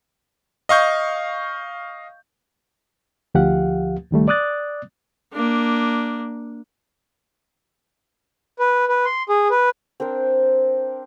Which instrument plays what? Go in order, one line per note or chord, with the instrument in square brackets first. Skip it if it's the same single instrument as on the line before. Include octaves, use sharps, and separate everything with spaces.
[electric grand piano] D#5 F5 C#6 G6
[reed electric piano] D2 F3 G4 F5 F#5
C#2 D#3 G3 A3
D5 D6 D#6 F#6 A6
[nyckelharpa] A#3 D4
[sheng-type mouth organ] B4
B4
C6
G#4
B4
[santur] C4 D4 A#4 C5